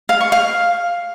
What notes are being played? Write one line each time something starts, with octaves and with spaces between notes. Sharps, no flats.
F5
C#6
F5